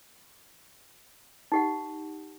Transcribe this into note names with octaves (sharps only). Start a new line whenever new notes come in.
D#4 G4 F#5